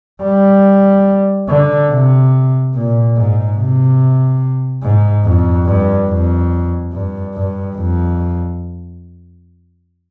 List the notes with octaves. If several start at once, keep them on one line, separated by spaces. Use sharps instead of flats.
G3
D3
C3
A#2
G#2
C3
G#2
F2
G2
F2
G2
G2
F2